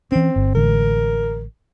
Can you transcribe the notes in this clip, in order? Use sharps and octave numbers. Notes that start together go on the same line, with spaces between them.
E3 C4 C#4
G1
A1 D3 G#3 A#4